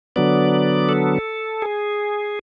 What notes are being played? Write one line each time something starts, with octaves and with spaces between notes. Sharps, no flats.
D3 F#3 B3 D5
A4
G#4